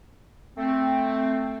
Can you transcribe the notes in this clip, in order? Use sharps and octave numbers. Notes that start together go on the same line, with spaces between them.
A3 C4